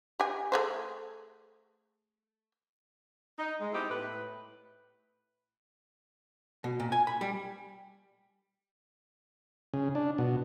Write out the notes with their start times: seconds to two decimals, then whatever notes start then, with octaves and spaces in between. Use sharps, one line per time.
0.20 G4 G#5
0.52 A3 G#4 C5
3.39 D#4
3.60 G#3
3.73 B3 C4 D#4 E4 G4
3.90 A2 B4
6.64 B2
6.80 A#2
6.92 G#5
7.07 B5
7.21 G3
9.74 C#3
9.95 D4
10.18 B2